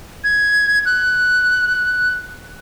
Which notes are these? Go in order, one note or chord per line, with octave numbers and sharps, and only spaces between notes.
G#6
F#6